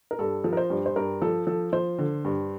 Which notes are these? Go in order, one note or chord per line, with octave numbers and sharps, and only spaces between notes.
A#4
G2 A4
F3
A#4
C5
G2
C5
G2 A#4
F3 A4
F3 A4
F3 C5
D3
G2